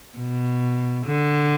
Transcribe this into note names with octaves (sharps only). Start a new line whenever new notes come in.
B2
D3